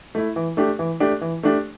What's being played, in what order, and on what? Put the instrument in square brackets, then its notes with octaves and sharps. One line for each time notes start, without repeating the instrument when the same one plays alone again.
[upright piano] A3 E4
E3
A3 D4 G4
E3
A3 D4 G4
E3
A3 D4 G4